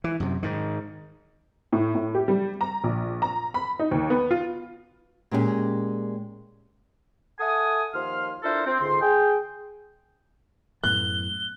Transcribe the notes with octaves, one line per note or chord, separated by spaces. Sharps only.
E3
F#2 C3
G#2 D#3
A2
A2
G4
G3
A#5
A#1
A#5
B5
D#4
D#2
B3
F4
A#2 G#3 C#4 E4 G4 G#4
A4 E5 F#5 G#5 D#6
D#2 F3 C6 F6
D4 E4 F4 A4 A#4 C5
C4
C#2 G#2 D3 C6
G#4 G5
F#2 A2 B3 F#6 G7